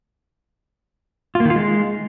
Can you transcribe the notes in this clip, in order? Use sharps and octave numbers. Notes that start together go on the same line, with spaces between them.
F4
A#3
D#3
F4
G#3